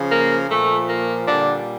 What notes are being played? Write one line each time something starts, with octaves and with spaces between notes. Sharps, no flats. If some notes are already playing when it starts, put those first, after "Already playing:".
Already playing: C#3 F3
A#3
A#2 F3 A3
A#3
A#2 D3 G3 D4